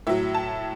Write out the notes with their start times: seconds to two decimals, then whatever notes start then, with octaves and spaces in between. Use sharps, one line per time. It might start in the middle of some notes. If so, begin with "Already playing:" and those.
0.07 A2 F#3 E5
0.35 A5